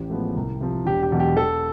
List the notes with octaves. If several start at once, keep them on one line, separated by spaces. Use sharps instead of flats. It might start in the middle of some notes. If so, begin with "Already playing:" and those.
Already playing: A1 G4
A2 F3 G#3 B3
C2
C3 F3
E1 G4
G4
E2 B2 F#3
G4
E2 A4